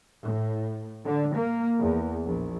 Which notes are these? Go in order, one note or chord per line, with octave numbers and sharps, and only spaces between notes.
A2
D3
A#3
E2
A#1